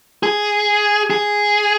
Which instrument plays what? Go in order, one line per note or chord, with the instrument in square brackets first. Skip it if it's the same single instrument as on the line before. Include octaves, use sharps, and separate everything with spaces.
[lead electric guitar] G#4
G#4